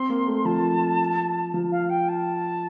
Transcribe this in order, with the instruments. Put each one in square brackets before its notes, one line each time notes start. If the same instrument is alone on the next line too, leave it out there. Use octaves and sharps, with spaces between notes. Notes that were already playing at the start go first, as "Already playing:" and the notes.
Already playing: [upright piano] C4 [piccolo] C6
[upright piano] A#3
A3
[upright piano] F3 [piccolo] A5
[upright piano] F3
[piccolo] F5
G5
A5